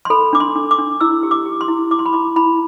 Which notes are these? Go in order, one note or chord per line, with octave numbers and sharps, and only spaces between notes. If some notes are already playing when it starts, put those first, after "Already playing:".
C6
A4 B5
D4 D6
C6
D4
D6
D4
E4 E6
G4
D6
G4
C6
E4
E4 D6
C6
B5
E4 C6
E4 B5